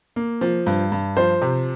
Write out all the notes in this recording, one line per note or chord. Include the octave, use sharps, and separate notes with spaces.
A#3
F3
G2
G2
F3 C5
C3